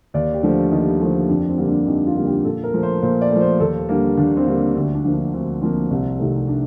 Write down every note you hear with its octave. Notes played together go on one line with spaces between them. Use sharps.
D#2 D5
G4
D3 F3 A3
D#2 D#4
D3 F3 A3
F2 D4
C4
D3 G3 A#3
D4
F2 D#4
F4
D3 G3 A#3
G4
A#2 A4
A#4
F3 A3
C5
A#2 C5
D5
F3 A3
C5
D#2 A4
D3 G3 A#3
D#2 D4
C4
D3 G3 A#3
D2 D4
D4
D3 F3 A#3
D4
D2 C4
D3 F3 A#3 C4
C2
C3 D#3 A3
D4